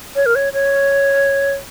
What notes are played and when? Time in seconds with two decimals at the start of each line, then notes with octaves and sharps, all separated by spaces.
0.16 C#5
0.26 A#4
0.35 C#5
0.53 C#5